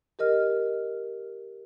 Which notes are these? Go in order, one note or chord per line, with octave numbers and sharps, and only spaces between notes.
G4 A#4 D#5 F6